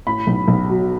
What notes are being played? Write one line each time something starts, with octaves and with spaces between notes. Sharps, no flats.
A2 B5
B1
B1
F#3